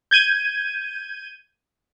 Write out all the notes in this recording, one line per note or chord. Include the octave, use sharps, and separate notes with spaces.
G6 G#6 D#7